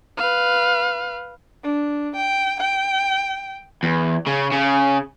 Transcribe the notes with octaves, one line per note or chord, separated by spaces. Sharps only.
B4 F5
D4
G5
G5
E2
C#3
C#3